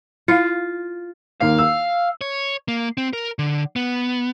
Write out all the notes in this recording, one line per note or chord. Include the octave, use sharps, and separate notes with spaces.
E4 F4 F5
D#2 A#3 F5 C7
E6
C#5
A#3
C4
A#4
D3
B3